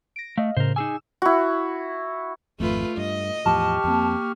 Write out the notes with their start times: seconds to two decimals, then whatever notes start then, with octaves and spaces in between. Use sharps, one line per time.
0.16 A#6 D7
0.38 A3 D#5 F5
0.57 A2 C#3 A#4 C5
0.76 D#4 G#4 G#5 D6 E6 E7
1.22 E4 F#4
2.60 G#1 F2 A3 F4 B4
2.97 G2 D#5
3.46 E2 A2 F3 G4 A5 C#6 F6
3.84 F2 A#3 C4